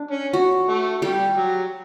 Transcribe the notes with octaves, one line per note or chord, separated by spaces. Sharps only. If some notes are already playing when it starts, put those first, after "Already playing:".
Already playing: D4
C#4
F#4
A3
G3 G4
F#3